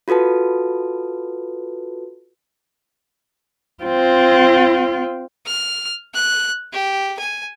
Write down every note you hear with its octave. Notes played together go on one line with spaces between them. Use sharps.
F4 F#4 A4 B4 A5
C4 F4
F6
F#6
G4
G#5